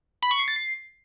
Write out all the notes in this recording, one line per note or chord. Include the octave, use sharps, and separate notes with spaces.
B5
C#6
C7
A6
C7